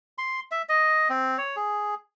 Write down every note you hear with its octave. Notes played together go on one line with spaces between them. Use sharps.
C6
E5
D#5
C4
C#5
G#4